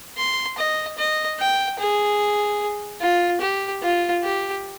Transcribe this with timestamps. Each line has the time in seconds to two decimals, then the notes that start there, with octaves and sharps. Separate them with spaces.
0.17 C6
0.58 D#5
0.98 D#5
1.39 G5
1.79 G#4
3.01 F4
3.41 G4
3.82 F4
4.23 G4